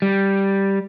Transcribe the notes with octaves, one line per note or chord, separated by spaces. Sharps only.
G3